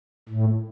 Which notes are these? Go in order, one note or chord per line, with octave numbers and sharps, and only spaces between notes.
A2